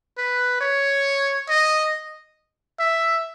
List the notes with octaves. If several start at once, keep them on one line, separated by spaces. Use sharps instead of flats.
B4
C#5
D#5
E5